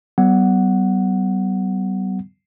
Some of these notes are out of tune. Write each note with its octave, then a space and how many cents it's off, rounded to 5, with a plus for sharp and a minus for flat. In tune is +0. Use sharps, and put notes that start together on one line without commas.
G3 -45 B3 +15 F#5 +0